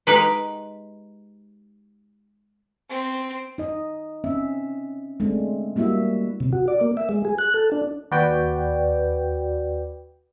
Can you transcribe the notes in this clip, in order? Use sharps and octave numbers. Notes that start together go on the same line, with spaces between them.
G#3 D#4 G4 A#4 B4
C4
D#4 D#5
C4 C#4 E5
G#3 A3 C4 D4
G3 A#3 E4 F#4 E5
C3
F#4
D5
A#3
E5
G#3
G#4
F#6
A4
D4
D#2 F#4 B4 D5 G5